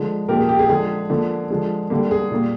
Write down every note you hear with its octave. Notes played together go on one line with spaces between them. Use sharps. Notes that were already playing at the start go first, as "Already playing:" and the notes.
Already playing: D3 F3 G#3
A#2 F3 A#3 G4 A#4
G#4
G4
G#4
D3 F3 G#3 G#4
D3 F3 A#3
D3 F3 G#3
D3 G3 A#3
G#4
A#2 G3 A#3